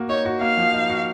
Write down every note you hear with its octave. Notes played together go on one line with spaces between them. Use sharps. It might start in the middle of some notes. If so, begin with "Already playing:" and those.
Already playing: A#3 F#4
D#4 C#5
F#4
A#3 F5
F3
D#4
F#4